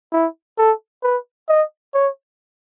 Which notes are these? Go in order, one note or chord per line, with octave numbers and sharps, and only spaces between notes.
E4
A4
B4
D#5
C#5